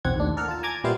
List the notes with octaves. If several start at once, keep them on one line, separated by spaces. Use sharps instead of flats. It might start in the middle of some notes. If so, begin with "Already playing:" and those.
B1 E2 C4 F#5 G#6
D#2 A2 D4
A4 A#4 F#5 F6
F4 A5
G#5 A#5 D6 G#6 A6
A#2 G3 B3 E4 C5 F5